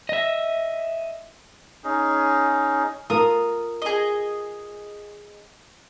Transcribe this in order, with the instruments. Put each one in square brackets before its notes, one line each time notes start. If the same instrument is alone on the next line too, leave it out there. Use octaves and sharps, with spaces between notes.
[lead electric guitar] D#5 E5
[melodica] C#4 D#4 G#4
[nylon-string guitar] F4 A#4 [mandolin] D#6
[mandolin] G#4 D#5